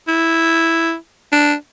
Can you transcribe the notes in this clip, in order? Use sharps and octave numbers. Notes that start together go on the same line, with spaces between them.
E4
D4